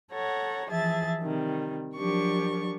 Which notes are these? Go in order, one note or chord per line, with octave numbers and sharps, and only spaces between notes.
A4 C#5 F#5 A#5
E3 F3 G#4 E5 A5 A6
C3 D#3 G3
F3 F#3 D4 G4 A#4 C#6